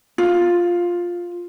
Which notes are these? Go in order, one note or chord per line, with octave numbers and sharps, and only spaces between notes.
F4